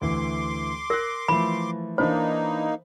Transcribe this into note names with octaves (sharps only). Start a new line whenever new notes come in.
D2 E3 C6 D6
A#4 F#6 A#6
E3 F3 A3 B5
E3 A#3 D4 D#4 C5 B5